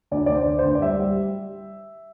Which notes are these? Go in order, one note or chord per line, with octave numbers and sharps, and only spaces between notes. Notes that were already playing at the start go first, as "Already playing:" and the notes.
D2 D5
D2 D5
C5
D3
C5
D2
D5
G3 E5
G3